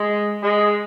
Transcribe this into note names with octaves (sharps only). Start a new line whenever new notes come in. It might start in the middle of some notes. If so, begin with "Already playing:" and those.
Already playing: G#3
G#3